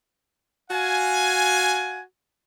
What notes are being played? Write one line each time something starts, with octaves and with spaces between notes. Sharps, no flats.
F#4 F5 G#5